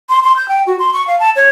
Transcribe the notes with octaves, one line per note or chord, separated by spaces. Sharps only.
C6
C6
G6
G5
F#4
C6
C#6
F5
A5
C#5